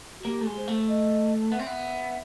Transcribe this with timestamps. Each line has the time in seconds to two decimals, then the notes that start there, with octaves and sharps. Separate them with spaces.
0.20 F#4
0.25 A#3 G4
0.41 A3
0.46 G#3
0.56 C5
0.68 A3
0.88 D#5
1.51 B3 E5
1.59 C4
1.66 B3